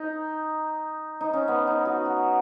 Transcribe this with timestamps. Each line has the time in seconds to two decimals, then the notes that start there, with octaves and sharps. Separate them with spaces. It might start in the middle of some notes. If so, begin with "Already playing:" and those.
Already playing: D#4
1.21 D#4
1.33 C#4
1.48 B3
1.67 D#4
1.85 F#4
2.05 F#4